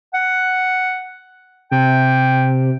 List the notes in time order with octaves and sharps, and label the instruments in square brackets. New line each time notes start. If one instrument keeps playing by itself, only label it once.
[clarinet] F#5
[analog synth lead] C3 [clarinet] G5